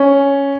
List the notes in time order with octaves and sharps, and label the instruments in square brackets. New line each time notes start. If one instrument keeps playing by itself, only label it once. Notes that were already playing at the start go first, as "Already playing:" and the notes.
Already playing: [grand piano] C#4